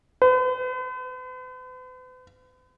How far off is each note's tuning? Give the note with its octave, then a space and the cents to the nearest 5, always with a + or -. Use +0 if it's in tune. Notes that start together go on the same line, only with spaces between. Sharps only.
B4 +45